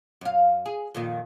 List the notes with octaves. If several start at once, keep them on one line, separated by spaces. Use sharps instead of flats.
F#2 F5
G#4
F2 A#2 D#3